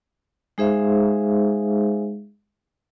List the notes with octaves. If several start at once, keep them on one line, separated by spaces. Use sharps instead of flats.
G#3 D#4 G#4 C5 E5 F5